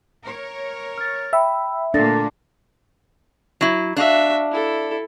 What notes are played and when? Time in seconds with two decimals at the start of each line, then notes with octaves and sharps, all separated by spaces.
0.23 A#4 C#5
0.98 F6 A6
1.33 E5 G5 B5
1.94 A#2 A3 A#3 D4 A4 A6 A#6
3.61 F#3 E4
3.96 D4 F#4 E5 F5
4.52 E4 A4